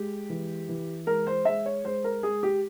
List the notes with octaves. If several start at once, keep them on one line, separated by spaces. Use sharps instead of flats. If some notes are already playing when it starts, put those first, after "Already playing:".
Already playing: G#3 G4
E3
E3
G#3 A#4
C5
G#3 E5
C#5
G#3 C5
A#4
G#3 G#4
G4